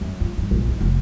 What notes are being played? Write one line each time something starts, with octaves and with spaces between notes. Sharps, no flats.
F#2
F3
G2
A#1
D#3
F1